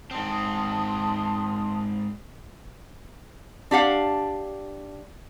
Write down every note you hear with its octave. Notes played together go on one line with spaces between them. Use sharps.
G#2 C4 A5 C6 D#6
D4 G4 F5 F#5